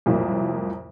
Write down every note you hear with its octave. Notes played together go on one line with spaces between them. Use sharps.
C2 F2 A2 F#3 A#3